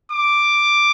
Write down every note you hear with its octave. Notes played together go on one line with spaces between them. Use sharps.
D6